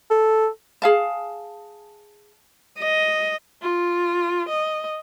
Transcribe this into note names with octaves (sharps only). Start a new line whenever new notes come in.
A4
G#4 F5 A5
D#5
F4
D#5